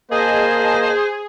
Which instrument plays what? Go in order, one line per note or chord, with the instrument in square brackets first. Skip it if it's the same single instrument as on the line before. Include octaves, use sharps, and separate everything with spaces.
[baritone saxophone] A#3 [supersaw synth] G#4 [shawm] C5 [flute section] D#5 A5